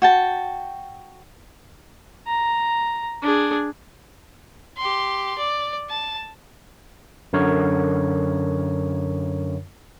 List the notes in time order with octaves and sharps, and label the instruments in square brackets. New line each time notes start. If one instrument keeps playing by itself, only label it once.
[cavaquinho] F#4 G5 A5
[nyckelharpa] A#5
D4 G#4
[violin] G4 C6
D5
A5
[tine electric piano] F#2 D3 A#4 C#5